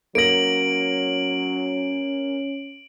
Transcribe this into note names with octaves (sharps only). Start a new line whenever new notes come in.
F#3 A#3 C#4 A#6 D7 F#7